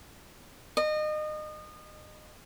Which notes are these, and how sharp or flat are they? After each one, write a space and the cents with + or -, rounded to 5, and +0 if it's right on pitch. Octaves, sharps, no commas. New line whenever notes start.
D#5 -30